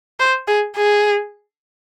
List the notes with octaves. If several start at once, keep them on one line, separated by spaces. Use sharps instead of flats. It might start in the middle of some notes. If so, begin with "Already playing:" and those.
C5
G#4
G#4